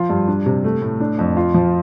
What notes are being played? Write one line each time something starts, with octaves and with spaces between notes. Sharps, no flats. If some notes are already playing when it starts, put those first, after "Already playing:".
Already playing: F3 F4
G2
D4
C3
A3
A2
D4
F2
F4
F3